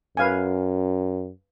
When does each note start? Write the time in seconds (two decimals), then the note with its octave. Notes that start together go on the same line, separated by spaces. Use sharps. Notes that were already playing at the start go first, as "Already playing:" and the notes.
0.17 F#2 B4 F5 G#5